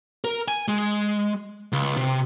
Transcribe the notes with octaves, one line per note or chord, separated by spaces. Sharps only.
A#4
G#5
G#3
C#2
C3